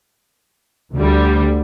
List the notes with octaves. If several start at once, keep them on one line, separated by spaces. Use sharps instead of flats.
D2 D3 G3